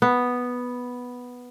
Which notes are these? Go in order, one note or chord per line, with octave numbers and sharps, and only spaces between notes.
B3